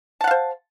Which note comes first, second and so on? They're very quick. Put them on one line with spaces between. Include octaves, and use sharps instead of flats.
A5 F#5 F5 C5